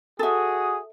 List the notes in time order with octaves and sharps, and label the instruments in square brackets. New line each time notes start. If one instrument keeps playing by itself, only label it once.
[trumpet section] F#4 G#4 D#6 [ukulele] A4 E5